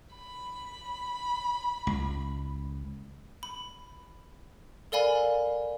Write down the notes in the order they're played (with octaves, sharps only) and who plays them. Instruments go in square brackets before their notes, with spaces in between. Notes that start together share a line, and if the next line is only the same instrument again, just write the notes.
[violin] B5
[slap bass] C#2
[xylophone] B5
A4 A#4 D5 F5 G#5 B5